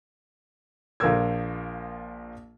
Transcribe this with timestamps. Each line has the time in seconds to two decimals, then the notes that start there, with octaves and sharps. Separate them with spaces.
1.00 A#1 F3 F4 A#4 E6 G#6